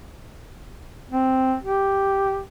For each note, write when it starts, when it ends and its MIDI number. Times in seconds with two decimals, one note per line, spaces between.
1.11 1.55 60
1.63 2.41 67